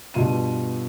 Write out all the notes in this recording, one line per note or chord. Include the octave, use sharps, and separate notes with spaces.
G2 B2 F4 D#7